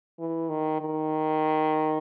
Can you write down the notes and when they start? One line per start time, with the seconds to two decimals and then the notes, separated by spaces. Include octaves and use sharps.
0.19 E3
0.49 D#3
0.81 D#3